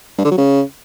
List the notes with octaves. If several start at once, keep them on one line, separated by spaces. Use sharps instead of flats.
G2
D3
F#3
C#3